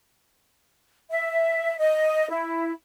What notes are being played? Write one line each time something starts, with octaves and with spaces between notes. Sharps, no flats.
E5
D#5
E4